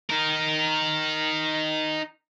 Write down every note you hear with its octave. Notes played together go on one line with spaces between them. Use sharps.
D#4 A#4